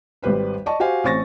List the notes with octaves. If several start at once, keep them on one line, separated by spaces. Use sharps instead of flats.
G#1 G3 G4 B4 C5
D5 D#5 A5 C#6
F#4 G4 C5 F5 G#5
A1 C4 C#6 A6 A#6